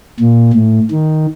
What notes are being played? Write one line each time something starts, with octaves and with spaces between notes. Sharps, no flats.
A#2
A2
D#3